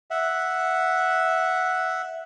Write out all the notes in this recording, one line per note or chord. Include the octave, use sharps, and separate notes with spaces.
E5 F#5